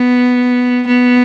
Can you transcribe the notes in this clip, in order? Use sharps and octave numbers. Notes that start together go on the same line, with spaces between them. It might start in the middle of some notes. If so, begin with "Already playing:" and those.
Already playing: B3
B3